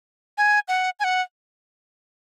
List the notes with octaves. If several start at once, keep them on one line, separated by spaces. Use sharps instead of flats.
G#5
F#5
G#5
F#5